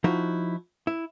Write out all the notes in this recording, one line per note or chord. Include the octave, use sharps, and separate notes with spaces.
F3 D#4 E4 F#4
E4